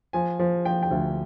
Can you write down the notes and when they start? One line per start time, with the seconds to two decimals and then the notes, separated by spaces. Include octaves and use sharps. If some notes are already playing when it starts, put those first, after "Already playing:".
0.13 F3 G#5
0.39 F3
0.65 F3 G5
0.83 G5
0.91 D2